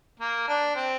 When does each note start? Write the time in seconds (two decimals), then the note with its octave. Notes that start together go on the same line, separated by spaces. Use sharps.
0.20 A#3
0.48 D4
0.76 C4